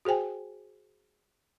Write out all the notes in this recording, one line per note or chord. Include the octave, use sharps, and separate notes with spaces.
F#4 G#4 C5 G5 G#5